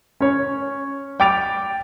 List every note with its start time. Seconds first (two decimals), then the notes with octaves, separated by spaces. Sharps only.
0.21 C#4 C#5
1.20 G5 D6 A6 D7 F7